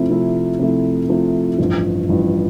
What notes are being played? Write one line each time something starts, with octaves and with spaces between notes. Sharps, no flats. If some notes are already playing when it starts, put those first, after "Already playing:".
Already playing: C3 F3 A3 E4
C3 F3 A3 E4
C3 F3 A3 E4
C3 F3 A3 E4
A1 G2 F3
A1 G2 F3